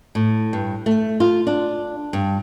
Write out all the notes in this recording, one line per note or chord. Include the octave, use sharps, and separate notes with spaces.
A2
G2
A3
F4
D4
G2